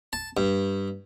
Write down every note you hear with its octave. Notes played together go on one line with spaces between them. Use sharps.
A5
G2